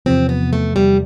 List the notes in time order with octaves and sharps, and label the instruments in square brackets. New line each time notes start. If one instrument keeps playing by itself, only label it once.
[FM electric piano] E2 C3 F3 [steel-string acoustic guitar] C4
[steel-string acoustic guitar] B3
A3
G3